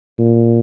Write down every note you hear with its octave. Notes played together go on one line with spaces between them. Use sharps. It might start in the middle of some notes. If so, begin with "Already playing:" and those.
A#2